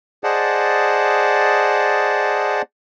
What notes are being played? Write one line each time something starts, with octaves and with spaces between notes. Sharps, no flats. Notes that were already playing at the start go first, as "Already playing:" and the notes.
G#4 C5 D5 D#5 F#5 A5